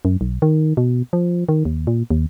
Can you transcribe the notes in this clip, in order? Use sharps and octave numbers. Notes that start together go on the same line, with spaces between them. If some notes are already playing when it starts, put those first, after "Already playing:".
F#2
B1
D#3
B2
F3
D#3
D#2
A#2
D#2